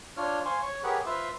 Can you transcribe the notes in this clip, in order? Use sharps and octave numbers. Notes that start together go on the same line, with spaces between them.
D4 F4 C#5 F6
C5 F5 G#5 C6 C#6
C#5 C#6
G4 G#4 A#4 B4 C#5 F#5
F4 B4 C5 E5 F5